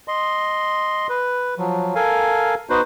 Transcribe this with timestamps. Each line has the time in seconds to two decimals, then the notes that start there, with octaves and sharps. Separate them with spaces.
0.08 D#5 C6
1.09 B4
1.59 F3 F#3
1.95 A4 A#4 F5 G#5
2.70 B3 D#4 F#4 B4 C5